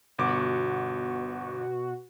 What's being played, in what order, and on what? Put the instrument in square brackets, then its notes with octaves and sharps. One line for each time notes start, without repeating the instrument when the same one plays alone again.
[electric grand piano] G1 D6 [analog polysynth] B2 F#4